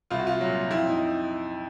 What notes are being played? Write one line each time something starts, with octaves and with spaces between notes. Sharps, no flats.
C2 F4
F#4
F4
A#2 F#3
F2 E4
D#4